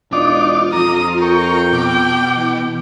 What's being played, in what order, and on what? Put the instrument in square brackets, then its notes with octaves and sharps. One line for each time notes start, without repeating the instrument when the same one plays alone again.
[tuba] E1 [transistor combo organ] D4 D#4 D6 [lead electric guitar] F4
[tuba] F2 [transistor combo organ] A#5 [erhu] D#6
[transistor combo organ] A#4 C#6 [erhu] G5
[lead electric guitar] B2 [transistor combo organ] D6
[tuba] E3